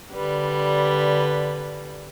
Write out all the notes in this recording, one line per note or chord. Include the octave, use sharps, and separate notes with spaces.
D3 G3 B4